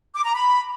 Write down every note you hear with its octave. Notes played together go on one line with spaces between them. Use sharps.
D6
A#5
B5